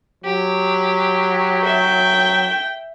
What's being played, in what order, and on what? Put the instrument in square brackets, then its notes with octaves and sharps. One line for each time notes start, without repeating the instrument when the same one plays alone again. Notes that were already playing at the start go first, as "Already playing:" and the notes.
[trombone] F#3 [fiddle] G4
[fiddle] E5 [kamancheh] G5